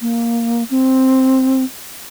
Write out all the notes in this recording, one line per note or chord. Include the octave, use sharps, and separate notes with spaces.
A#3
C4